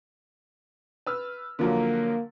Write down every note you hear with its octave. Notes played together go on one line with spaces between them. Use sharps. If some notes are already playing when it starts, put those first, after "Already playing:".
B4 E6 F6
D3 F3 F#3 A#3